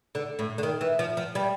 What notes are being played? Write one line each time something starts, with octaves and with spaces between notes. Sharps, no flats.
D3
A2
D3
D#3
E3
F3
F3
G3